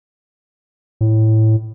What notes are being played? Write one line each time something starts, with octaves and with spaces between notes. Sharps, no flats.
A2